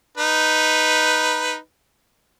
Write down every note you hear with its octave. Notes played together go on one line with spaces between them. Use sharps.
D#4 B4